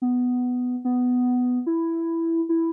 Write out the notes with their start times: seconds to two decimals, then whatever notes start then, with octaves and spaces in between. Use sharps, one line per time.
0.02 B3
0.85 B3
1.67 E4
2.49 E4